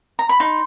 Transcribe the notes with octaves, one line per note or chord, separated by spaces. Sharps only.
A#5
B5
D#4 C6